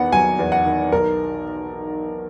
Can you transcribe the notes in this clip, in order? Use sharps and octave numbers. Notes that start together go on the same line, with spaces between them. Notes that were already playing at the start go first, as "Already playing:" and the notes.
Already playing: E2 D#3 B3 F#5
F#3 G#5
E2
F#5
D#3
B1 A#4